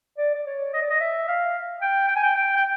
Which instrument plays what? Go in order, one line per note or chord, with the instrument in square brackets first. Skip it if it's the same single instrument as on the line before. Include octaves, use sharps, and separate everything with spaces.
[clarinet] D5
D5
C#5
D#5
D5
D#5
E5
F5
G5
G5
G#5
G5
G5
G5